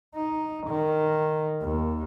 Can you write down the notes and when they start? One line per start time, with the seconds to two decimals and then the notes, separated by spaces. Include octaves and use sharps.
0.15 D#4
0.67 D#3
1.61 D#2